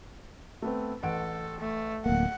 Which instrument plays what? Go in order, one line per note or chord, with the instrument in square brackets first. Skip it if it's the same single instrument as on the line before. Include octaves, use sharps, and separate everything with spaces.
[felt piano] A3 B3 C4
[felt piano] A1 F#5 D7 [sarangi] A4
[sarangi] A3
[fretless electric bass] D1 A#3 [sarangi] F#5